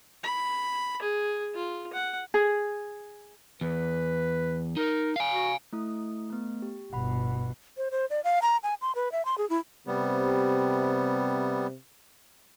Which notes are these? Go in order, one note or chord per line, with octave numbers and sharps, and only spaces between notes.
B5
G#4
F4
F#5
G#4
E2 B4
D#4 A#4
F5 G#5
F#4
A3 E4 D#6
A3 B3
G4
G1 B2 F#5 B5
C5
C5
D5
F5
A#5
G#5
C6
B4
E5
C6
G#4
E4
C3 G3 B3